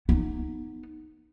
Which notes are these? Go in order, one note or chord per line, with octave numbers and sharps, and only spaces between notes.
B3 D#4